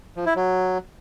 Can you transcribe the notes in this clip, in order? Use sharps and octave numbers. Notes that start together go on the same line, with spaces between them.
F3
E4
F#3